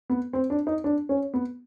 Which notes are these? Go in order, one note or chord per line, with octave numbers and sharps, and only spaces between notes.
B3
C4
D4
D#4
D4
C#4
B3